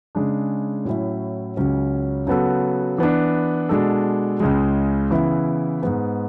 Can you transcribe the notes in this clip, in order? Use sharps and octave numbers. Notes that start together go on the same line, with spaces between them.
C#3 G#3 D4
A2 F#3 C#4 E4
C#2 C#3 F#3 C#4
C#3 F#3 B3 F#4 A4
E3 B3 D4
B2 G#3 D4 A4
C#2 C#3 G#3
C#3 E3 B3 E4
G#2 G#3 B3